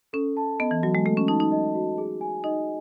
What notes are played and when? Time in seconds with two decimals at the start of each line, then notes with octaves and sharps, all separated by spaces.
0.13 C#4 A4
0.37 A5
0.60 B3 D#5
0.71 E3
0.83 F#3 F#4
0.95 G#3
1.05 A3 A4
1.17 C#4
1.28 D#4 A5
1.40 D#4
1.52 D#5
1.75 F#4
1.98 G#4
2.21 G#5
2.44 D#4 D#5